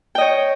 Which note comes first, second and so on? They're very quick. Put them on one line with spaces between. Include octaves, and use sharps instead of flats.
G5 D#5 C#5